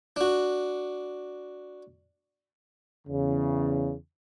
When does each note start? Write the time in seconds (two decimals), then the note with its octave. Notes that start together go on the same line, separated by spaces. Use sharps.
0.16 D4 F#4
3.06 E2 C#3